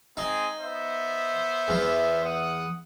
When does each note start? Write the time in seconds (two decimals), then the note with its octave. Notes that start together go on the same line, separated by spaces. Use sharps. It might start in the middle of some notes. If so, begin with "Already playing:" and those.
0.17 G#3 C4 D#4 G#4
0.59 B3 C5 E5
1.68 E2 E3
2.25 F#5 D#6